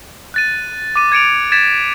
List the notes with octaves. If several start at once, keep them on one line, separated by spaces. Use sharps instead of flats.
F#6 A6 D#7
D6 D#7
G#6 C#7 D7 F7
G#6 A6 B6 E7